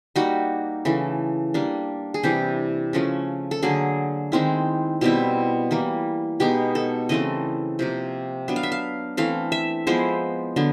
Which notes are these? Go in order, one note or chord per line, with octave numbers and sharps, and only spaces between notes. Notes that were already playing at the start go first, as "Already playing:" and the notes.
G3 A#3 D#4 F#4
C#3 E3 A3
G3 A#3 D4
G#4
C3 E3 G3 G4
C#3 F3 A3 C#4
A4
D3 F#3 A#3 G#4
D#3 G#3 C4 E4
B2 G3 C4 E4
E3 G3 A#3
B2 G#3 B3 D#4 G4
A4
C#3 E3 A3 C4 D#5
C3 F3 A#3
F#3 B3 D4
F5
E5
F5
E3 A3 C4 F5
E5
F3 G#3 B3 E4 C5
D3 F#3 B3